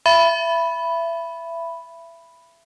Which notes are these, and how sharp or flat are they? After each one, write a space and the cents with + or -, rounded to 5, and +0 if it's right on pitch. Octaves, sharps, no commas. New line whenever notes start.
E5 +25 B5 +0